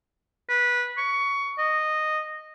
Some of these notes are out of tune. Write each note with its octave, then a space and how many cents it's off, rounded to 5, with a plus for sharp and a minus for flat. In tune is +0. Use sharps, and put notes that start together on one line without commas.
B4 -15
C#6 +20
D#5 -10